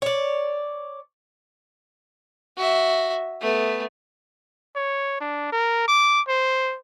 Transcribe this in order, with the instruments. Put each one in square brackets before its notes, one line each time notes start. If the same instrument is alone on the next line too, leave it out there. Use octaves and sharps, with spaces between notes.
[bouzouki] C#5 D5
[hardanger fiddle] F#4 E5
A3 B3
[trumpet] C#5
D4
A#4
D6
C5